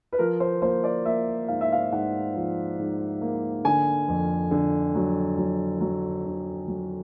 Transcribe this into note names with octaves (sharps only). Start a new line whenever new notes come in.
B4
F3 A#4
C5
A#3 C5
D5
A#3 E5
G#2 F5
E5
F5
G#2 F#5
F3
G#2
A#3
D3 G#5
F2
D3
F#3
F#3
F#3
D3
F#3